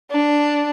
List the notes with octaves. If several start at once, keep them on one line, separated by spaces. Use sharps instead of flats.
D4